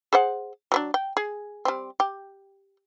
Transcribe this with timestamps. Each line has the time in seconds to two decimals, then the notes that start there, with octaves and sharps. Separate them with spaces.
0.13 G#4 C5 F#5
0.72 F#3 B3 D4
0.94 G5
1.17 G#4
1.65 G3 C4
2.00 G4